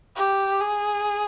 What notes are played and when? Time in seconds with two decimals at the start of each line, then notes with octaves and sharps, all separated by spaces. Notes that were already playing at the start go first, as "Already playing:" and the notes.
0.16 G4
0.60 G#4